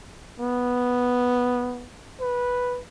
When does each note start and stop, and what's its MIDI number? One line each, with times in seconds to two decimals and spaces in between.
0.40 1.90 59
2.20 2.80 71